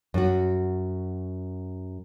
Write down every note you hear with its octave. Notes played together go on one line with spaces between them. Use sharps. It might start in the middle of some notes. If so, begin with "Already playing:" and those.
F#2 F#4